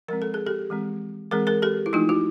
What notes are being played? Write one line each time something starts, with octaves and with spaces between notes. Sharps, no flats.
F3 G#3 C4 A#4
A4
G#4
G4 A4
E3 G#3 C4
E3 G#3 C4 G#4 A#4
G#4 A#4
G4 A4
E4
F3 A3 D4 D#4 F4
E4 F#4